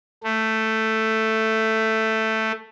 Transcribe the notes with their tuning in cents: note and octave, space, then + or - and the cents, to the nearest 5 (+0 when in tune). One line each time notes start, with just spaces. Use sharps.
A3 +5